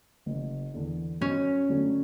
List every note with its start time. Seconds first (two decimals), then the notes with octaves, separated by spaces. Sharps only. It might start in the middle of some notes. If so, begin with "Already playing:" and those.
0.26 F#1
0.74 E2 D3
1.21 F#2 C#4
1.69 D3 F#3 A3